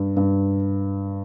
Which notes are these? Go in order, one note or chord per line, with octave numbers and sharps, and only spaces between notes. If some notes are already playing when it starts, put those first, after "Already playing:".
Already playing: G2
G2